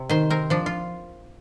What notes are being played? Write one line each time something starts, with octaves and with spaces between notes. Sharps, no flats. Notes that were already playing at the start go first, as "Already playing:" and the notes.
Already playing: C3
D#3 C5
C4 A#4
F3 D4
F4